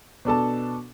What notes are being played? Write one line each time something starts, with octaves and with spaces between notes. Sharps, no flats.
B2 D4 A4 A5